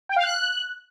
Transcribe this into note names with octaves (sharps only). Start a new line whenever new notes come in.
G5
F5
F#6